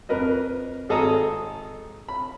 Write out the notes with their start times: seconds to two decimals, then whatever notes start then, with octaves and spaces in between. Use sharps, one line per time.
0.09 F2 A#4 B4 D#5
0.89 G#1 G#4 A4 D#5 A#5 D#6
2.08 B5